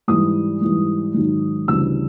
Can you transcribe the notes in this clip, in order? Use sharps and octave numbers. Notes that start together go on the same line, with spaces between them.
G#2 E3 G3 D#6
G#2 E3 G3
G#2 D#3 F#3
D2 C#3 E3 G3 E6